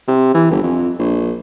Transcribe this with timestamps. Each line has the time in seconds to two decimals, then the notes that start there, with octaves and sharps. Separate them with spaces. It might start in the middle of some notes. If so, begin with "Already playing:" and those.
0.08 C3
0.34 E3
0.51 G1
0.63 F2
0.99 A#1